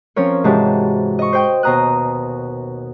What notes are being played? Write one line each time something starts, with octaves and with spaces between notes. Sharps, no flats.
F3 C4 C#4 F4 A#4 C#5
G#2 C3 E3 F#4 G4 A5
D#5 C#6
C5 G5 G6
D#2 B2 C5 A#5 D#6 F#6